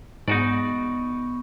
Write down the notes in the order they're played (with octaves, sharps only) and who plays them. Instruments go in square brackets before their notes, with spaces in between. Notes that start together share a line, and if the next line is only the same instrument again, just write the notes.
[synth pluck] G#2 [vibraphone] B3 C#6 [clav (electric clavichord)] D#4 F#4 D5